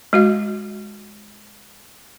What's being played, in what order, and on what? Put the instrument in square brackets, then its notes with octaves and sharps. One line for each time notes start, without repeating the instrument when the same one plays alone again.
[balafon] G#3 F#4 F5